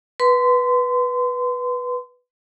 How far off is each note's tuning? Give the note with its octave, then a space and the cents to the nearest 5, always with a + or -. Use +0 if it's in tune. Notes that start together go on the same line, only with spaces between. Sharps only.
B4 -5 C6 -30